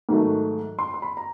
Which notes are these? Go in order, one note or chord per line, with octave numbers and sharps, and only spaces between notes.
G#2 D#3 F#3 A3
C6
C6
B5
A#5